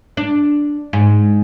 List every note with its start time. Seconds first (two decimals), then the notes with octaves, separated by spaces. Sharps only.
0.17 D4
0.93 G#2